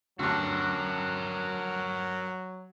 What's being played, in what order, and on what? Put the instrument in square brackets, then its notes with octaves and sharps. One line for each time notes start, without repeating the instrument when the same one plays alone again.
[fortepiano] D2 G2 [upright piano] D3 [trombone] F#3 [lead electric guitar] F#4 A#4